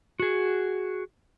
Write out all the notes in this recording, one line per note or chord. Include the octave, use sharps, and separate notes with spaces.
F#4 G#4